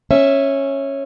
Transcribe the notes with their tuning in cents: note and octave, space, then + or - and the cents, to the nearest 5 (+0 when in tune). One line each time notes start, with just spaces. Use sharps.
C#4 -10 E5 +0